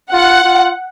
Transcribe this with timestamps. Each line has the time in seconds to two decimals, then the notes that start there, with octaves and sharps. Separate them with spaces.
0.13 F4 F#5
0.44 F4